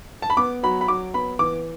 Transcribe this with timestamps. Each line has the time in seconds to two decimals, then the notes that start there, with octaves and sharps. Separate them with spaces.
0.22 A5
0.30 B5
0.37 B3 D6
0.63 F#3 B5
0.81 B5
0.88 F#3 D6
1.14 B3 B5
1.39 E3 D6